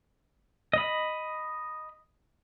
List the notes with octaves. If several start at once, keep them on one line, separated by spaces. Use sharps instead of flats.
D#5 B5